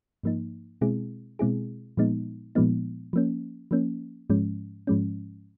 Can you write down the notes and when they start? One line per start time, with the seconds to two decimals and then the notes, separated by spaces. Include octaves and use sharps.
0.23 G#2 F3 A#3 D#4
0.81 B2 G#3 C4 E4 G#4
1.39 B2 G#3 C4 E4 G#4
1.97 A#2 F3 G#3 B3 D#4
2.55 A#2 F3 G#3 B3 D#4
3.13 F3 A#3 C#4
3.71 F3 A#3 C#4
4.30 G#2 F3 G#3 C#4
4.87 G#2 F3 G#3 C#4